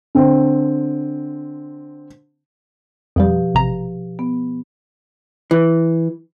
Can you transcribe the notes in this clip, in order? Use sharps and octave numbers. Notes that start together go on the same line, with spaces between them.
D3 C4
F2 B2 F3 G3 G4
A1 C3 A#5
B3
E3